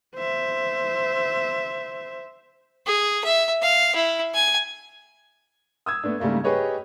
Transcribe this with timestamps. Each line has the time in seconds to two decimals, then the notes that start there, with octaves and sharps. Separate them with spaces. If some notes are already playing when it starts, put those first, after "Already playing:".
0.16 C5 E5
2.87 G#4
3.24 E5
3.62 F5
3.95 E4
4.34 G#5
5.86 D#6 E6 G#6
6.04 A3 B3 D4
6.20 G#2 C#3 G3 A3 A#3
6.44 G4 G#4 B4 C#5 D#5